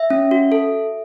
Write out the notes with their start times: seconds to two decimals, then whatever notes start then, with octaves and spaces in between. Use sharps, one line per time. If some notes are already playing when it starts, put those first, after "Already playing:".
Already playing: E5
0.10 C#4
0.31 F#4
0.52 A4